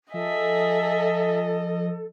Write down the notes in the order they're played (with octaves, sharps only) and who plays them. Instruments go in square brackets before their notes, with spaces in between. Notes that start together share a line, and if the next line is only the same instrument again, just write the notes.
[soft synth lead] F3 [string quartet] G#4 E5 [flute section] A4 [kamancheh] D#5